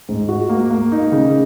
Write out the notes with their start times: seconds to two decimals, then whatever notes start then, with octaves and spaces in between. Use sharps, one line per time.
0.09 G#2
0.29 F#4
0.49 A#3
0.70 A#3
0.92 D#4
1.12 C#3